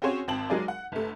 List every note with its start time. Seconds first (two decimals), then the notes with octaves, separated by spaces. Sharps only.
0.02 C4 C#4 F#4 G#4 C5 C#5
0.28 G#1 C4 A5 F#7
0.50 F#3 G#3 D#4 G#4 A#4 D5
0.68 F#5
0.92 G1 A3